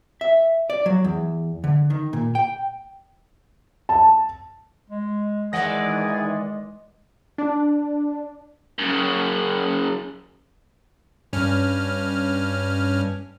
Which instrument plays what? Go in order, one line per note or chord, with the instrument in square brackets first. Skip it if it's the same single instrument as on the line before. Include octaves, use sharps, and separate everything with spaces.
[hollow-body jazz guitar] E5
D5
F#3
E2
D3
D#3
A#2
G5
[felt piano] A5
[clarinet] G#3
[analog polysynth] D#3 E3 D5 [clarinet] G#3 [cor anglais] G#4 [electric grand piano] F#5 A#6
[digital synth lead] D4
[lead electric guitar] F#2 C#3
[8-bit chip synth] G2 C#4 F6